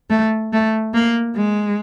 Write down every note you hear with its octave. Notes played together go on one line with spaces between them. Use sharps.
A3
A3
A#3
G#3